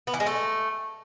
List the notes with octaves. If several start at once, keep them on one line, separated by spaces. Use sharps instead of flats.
B3
E3
G#3
A3